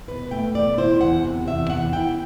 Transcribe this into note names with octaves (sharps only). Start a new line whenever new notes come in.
B2 B4
A3 G5
B2 D5
E4 C5
E2 F#5
C3
E2 E5
E3 F#5
E4 G5